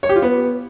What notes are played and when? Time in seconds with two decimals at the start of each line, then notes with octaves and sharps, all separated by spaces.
0.03 C#5
0.09 G4
0.16 F4
0.22 B3